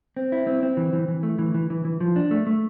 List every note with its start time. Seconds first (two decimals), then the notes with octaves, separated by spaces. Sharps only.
0.17 C4
0.32 E4
0.47 C4
0.63 C4
0.77 E3
0.93 E3
1.08 E3
1.23 A3
1.39 E3
1.54 E3
1.70 E3
1.85 E3
2.01 F3
2.16 D4
2.31 A3
2.47 A3